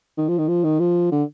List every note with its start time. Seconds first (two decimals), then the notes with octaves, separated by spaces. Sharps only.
0.18 D#3
0.29 F3
0.39 D#3
0.49 F3
0.64 D#3
0.80 F3
1.12 D3